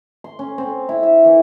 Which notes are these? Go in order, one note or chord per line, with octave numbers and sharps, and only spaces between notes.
C6
C#4
C4
E4
E5
E3